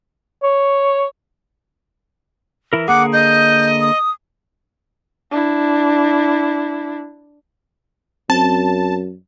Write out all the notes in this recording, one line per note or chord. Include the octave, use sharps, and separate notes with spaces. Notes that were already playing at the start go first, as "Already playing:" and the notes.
C#5
E3 E4 A#4
D3 A#3 G#4 F#5 D6
D#5 G6
D#6
D4 E4
F#2 C4 A5